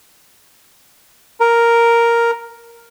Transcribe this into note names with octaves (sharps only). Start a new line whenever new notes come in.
A#4